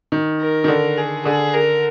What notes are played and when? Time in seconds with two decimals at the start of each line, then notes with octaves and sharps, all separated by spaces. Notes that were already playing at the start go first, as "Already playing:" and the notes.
0.12 D#3
0.40 A#4
0.64 D#3
0.68 D3
0.97 G#4
1.25 D3 G#4
1.54 A#4